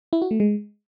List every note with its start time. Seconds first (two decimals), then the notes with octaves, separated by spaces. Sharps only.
0.13 E4
0.22 F#4
0.31 A3
0.40 G#3